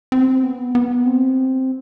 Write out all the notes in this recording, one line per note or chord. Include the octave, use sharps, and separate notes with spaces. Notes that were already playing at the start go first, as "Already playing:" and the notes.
C4
B3
B3
C4